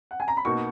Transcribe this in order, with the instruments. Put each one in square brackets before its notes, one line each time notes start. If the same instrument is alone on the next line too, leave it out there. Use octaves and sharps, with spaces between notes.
[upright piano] F#5
G#5
A#5
B5
[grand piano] B2 A#3 D#4 F#4 [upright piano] C#6